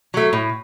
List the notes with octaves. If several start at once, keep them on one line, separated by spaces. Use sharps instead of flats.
F#3 A3
A2